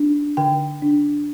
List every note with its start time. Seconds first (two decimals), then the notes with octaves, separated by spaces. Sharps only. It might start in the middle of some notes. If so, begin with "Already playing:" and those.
Already playing: D4
0.37 D3 G5
0.82 D4